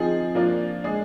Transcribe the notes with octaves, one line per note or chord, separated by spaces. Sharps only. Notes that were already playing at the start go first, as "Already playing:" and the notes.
Already playing: F3 C4 D#4 G#4
F3 A#3 D4 F4
G#3 D4 G#4